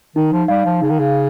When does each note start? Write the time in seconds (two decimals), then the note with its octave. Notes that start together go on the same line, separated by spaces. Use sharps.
0.16 D#3 D#4
0.32 F3
0.48 G3 F5
0.65 F3
0.82 C#3 D#4
0.90 D#3
0.99 C#3